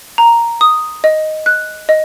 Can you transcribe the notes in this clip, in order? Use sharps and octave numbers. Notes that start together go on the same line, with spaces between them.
A#5
D#6
D#5
F#6
D#5